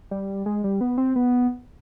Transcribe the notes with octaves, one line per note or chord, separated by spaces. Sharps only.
G3
G#3
G3
B3
C4
B3